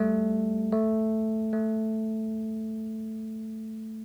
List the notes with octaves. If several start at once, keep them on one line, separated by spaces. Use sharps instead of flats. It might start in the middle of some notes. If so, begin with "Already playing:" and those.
Already playing: G3 A3
A3
A3